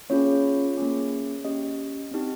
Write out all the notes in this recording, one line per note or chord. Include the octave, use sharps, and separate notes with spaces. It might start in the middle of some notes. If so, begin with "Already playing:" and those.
A#3 C#4 F4 G#4 C#5
A#3 C#4 G#4
C#4 G4 D#5
C4 D#4 G4